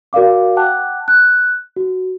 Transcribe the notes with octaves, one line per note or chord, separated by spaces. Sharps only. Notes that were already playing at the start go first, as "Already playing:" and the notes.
F#4 A#4 D5 F5 D6
F#5 G5 A5 D6 F#6
F#6
F#4